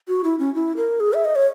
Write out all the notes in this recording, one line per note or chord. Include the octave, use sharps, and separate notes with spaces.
F#4
E4
C#4
E4
A#4
G#4
E5
D#5
C#5